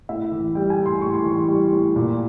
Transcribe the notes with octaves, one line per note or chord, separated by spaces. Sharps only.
A2 E5
E3
G3 G5
G#5
A2
C6
A2 C#6
C6
E3 C6
G3
A2
A#2